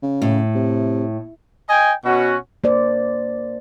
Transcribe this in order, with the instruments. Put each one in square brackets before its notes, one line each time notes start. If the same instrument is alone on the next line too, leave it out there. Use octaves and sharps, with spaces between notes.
[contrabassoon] C#3
[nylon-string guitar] A2
[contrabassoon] C3
[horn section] D#5 G5 G#5
B2 C#4 F#4
[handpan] A#3 C5 D5